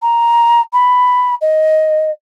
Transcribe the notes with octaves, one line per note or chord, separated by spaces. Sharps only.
A#5
B5
D#5